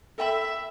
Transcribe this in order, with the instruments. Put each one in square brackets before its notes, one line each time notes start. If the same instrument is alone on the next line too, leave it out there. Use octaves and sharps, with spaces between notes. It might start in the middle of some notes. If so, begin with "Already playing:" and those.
[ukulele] A4 G5 B5 [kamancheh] E5